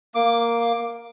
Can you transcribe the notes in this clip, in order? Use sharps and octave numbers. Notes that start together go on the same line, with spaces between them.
A#3 D6